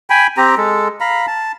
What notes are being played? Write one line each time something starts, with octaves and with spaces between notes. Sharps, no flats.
G5 G#5 B5
C4 G4 A#5
G#3 A4
F5 A#5 B5
A5